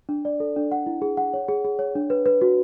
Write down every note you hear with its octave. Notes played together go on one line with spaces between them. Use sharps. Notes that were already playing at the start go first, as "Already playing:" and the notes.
D4
D5
A4
D4
F#5
E4
G#4
F#5
C#5
G#4
G#4
C#5
D4
B4
B4
F#4